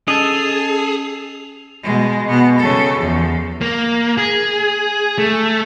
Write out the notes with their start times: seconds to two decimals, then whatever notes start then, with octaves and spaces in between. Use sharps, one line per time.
0.08 C#4 G#4 A4 D#5 F7
1.83 B2 G#3
2.26 B2 B3
2.59 C#3 A4
2.98 E2 F3
3.61 A#3
4.18 G#4
5.18 A3